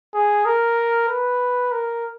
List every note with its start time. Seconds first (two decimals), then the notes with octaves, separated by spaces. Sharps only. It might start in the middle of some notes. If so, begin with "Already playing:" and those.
0.14 G#4
0.45 A#4
1.08 B4
1.72 A#4